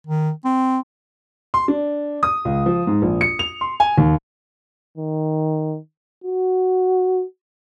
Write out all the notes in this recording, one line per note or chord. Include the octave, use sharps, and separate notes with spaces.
D#3
C4
C6
D4
D#6
C#2
F3
G#2
A#1
C#7
F7
C6
G#5
D#2
D#3
F#4